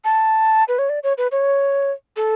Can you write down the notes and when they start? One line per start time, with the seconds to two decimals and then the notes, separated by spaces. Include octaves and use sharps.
0.04 A5
0.68 B4
0.79 C#5
0.89 D5
1.03 C#5
1.18 B4
1.32 C#5
2.16 A4